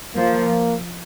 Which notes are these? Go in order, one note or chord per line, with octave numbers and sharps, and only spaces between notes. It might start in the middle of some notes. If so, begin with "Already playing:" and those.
F3 A#3